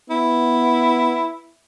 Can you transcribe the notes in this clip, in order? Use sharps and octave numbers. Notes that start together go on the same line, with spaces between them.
B3 E4